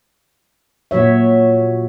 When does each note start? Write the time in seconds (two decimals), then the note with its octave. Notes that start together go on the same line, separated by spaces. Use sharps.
0.91 A#2 F#3 F#4 C#5 E5